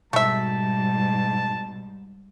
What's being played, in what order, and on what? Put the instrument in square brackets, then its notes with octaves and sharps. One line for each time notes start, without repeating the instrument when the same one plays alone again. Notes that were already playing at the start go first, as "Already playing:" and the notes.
[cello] G#2 G3 [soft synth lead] B2 [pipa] A3 E5 [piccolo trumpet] A5